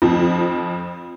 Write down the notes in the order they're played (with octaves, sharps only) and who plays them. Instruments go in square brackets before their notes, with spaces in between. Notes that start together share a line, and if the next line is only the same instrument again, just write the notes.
[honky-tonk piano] F2 F3 C4